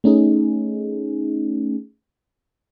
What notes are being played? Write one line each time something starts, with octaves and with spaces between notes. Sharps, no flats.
A3 C#4 D#4 G#4